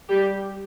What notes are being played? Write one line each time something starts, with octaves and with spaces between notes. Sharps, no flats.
G3 G4